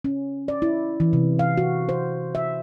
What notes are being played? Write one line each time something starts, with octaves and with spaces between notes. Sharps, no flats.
C#4
D5
E4
E3
C3
F5
F#4
C5
E5